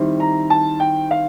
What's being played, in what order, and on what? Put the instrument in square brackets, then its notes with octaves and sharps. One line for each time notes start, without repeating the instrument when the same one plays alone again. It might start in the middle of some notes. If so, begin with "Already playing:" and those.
Already playing: [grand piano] D#3 G3 C4 E4
A#5
A5
G5
F5